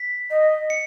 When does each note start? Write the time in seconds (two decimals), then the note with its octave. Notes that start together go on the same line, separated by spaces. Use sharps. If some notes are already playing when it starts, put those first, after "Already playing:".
Already playing: B6
0.30 D#5
0.70 C#7